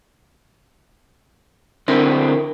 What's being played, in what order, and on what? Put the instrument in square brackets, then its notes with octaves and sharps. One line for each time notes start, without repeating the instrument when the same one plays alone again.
[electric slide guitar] D3 C4 E4 [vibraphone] A#4